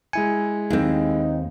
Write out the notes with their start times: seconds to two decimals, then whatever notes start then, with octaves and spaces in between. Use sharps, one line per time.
0.13 G#3 E4 G#5 C#7
0.70 D#2 C4 D#4